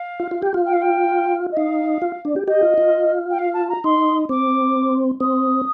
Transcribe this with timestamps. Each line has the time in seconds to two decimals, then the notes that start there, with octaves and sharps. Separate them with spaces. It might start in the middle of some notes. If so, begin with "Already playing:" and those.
Already playing: F5
0.20 F4
0.31 F4
0.42 G4
0.54 F4
0.65 G5
0.73 F5
0.81 G5
1.52 D#5
1.57 D#4 F5
2.02 F4
2.25 D4
2.36 G4
2.47 G4 D#5
2.63 F4
2.78 F4
3.30 G5
3.38 F5
3.54 A5
3.69 A#5
3.84 D#4 C6
4.29 C4 D6
5.20 C4 D#6